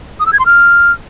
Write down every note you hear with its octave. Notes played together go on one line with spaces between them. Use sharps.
D#6
E6
G#6
C6
F6